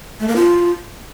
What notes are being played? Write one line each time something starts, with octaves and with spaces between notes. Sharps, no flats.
A3
A#3
F4